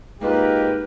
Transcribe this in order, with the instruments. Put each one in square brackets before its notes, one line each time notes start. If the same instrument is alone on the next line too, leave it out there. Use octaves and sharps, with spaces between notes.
[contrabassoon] G#2 [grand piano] A#3 D#4 F4 [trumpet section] G4 A#4 [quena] B4